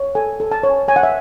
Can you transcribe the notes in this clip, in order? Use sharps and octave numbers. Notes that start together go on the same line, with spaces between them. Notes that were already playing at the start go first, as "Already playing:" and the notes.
Already playing: C#5
A4 G#5
A4
A5
C#5
G#5
C#5 G#5
F#5
E5